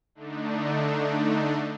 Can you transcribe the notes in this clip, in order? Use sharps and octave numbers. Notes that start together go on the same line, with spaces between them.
D3 A3 D4 D#4